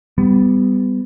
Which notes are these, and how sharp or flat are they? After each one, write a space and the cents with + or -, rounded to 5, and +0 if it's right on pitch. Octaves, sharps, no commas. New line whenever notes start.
G3 +0 B3 +25